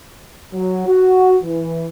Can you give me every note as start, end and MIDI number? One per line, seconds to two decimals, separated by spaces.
0.53 0.84 54
0.87 1.37 66
1.44 1.87 52